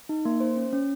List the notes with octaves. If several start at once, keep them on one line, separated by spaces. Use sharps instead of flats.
D#4
A#3
C5
C#4
C#4